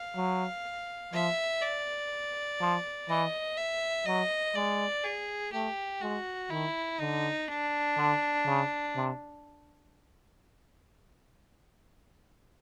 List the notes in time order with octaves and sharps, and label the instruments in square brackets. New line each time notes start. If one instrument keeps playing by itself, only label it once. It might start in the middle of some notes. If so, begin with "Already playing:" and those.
Already playing: [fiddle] F5
[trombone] F#3
[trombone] F3 [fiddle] E5
[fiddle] D5
[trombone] F3
[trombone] E3 [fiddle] D#5
[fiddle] E5
[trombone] F#3 [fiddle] D#5
[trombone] G#3 [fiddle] D5
[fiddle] G#4
[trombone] A3 [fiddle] G4
[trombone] G#3 [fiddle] F#4
[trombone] D#3 [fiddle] E4
[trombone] D3 [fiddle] D#4
[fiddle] D4
[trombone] D3
C#3
C3